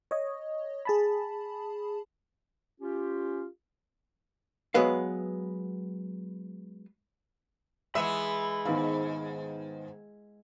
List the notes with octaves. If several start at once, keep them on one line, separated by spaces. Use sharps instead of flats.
C#5 D#5
G#4 A5 B5
C#4 F4 G4
F#3 G#3 B3 B4 F5
E3 G#3 B3 E5 B5
G#2 D#3 B3 F5